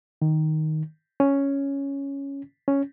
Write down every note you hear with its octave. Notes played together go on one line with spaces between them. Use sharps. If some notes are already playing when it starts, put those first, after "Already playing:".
D#3
C#4
C#4